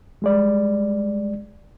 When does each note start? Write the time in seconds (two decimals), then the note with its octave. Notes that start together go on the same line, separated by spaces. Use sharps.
0.22 G3 G#3 D5